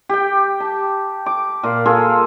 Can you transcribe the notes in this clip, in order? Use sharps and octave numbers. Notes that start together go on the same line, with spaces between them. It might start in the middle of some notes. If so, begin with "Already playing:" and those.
G4 G5
A5
D6
A#2 F5
A#3 F4 G#4 A4